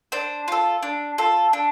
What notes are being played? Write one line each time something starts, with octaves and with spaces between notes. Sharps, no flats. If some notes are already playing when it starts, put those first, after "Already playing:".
D4 C5
F4 A4
D4
F4 A4
D4